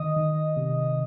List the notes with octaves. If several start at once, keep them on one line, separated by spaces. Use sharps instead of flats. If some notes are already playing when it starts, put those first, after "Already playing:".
Already playing: D#3 D#5 D#6
D#3
C3